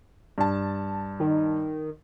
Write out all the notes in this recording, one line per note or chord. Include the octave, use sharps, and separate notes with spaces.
G2 A5
D#3